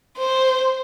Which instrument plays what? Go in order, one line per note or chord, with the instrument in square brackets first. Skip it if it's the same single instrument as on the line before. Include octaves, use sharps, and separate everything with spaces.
[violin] C5